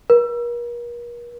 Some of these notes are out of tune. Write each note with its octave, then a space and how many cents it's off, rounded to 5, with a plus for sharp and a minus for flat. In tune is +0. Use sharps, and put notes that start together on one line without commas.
A#4 +40